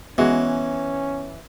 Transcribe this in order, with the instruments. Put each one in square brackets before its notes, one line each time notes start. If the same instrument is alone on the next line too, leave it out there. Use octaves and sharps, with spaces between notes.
[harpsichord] E3 [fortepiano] G#3 F#4 [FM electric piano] B3 [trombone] C#4